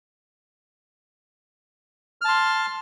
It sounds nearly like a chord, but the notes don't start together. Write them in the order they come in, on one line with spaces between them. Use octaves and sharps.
F6 A5 C6